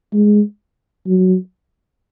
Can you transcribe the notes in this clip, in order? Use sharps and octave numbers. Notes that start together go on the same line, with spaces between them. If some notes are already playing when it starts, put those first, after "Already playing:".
G#3
F#3